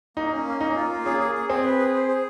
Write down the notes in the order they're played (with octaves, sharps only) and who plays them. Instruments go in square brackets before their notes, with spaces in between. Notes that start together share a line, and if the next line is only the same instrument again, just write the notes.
[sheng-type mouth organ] A#3 [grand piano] D#4
[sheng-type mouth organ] C#4
A#3
[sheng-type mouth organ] A#3 [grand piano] D#4
[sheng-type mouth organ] F4
A#3
[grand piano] C#4 [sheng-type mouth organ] G#4
[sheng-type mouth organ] G#4
G#4
[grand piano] C4 [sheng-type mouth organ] G#4
[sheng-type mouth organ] B4
G#4
C5
G#4